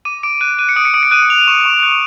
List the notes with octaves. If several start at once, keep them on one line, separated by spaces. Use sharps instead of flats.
D6 D#7
D6 D7
F#6 D#7
F#6 D#7
C#7
D#6 D7
C#7
D#6 D7
C#7
F#6 D#7
F#6 F7
C#6 E7
C#6
F#6